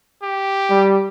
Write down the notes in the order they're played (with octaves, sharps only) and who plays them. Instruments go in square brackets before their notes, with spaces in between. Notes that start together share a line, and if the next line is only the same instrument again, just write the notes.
[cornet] G4
[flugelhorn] G3